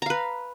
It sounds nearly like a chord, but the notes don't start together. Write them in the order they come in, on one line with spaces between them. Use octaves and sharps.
A#5 F5 B4